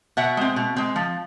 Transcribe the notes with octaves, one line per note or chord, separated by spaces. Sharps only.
B2 E5 F#5
G#3 C4
B2
G#3 C4
F3